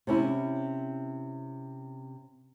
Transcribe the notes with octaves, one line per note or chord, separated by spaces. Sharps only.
C3 C#4 E4